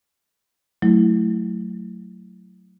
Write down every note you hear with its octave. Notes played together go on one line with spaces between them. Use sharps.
F#3 A3 E4